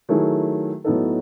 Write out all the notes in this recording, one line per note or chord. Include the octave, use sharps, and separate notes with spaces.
D#3 F#3 A3 E4 G#4
A2 F#3 B3 D#4 A4